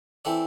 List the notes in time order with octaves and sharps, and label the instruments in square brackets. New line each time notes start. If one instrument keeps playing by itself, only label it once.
[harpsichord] E3 C4 A4 D5